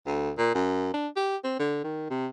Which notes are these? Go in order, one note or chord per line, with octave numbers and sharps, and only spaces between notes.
D2
A#2
F#2
D4
G4
C4
D3
D#3
C3